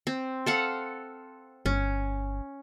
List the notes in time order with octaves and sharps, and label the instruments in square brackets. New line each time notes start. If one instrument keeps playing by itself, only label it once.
[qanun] C4
A4 F5 F#5
[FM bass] G1 [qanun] C#4